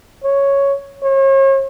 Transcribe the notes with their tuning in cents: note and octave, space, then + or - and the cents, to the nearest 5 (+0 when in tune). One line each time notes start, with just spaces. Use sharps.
C#5 +0
C#5 -40